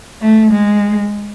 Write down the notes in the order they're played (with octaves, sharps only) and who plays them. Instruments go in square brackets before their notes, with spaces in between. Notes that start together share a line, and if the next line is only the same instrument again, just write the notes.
[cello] A3
G#3